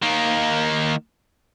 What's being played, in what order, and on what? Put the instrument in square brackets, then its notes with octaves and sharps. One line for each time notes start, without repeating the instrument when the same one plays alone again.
[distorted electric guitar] D#3 A#3